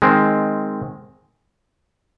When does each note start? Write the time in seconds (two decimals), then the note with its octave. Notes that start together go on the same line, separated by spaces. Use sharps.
0.02 D#3 G#3 C4